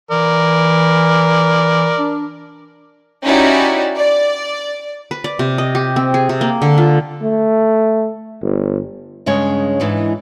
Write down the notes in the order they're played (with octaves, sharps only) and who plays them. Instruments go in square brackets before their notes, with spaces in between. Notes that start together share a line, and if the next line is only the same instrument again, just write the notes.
[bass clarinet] E3 [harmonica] A#4 D5
[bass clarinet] D4
[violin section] C#4 D#4 E4 F#4 G4 D5
D5
[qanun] B4
D5
C3
D#5
G4
C4
G#4
C3
A#3
D3
F4
[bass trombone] A3
G1
[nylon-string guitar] G2 C#3 G#3 C#4 C#5
G#2 E3 D4 D#4